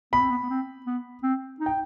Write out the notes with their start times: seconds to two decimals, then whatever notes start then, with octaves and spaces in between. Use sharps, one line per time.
0.13 B3 B5
0.21 C4
0.30 B3
0.43 B3
0.50 C4
0.86 B3
1.23 C4
1.60 D#4
1.66 G5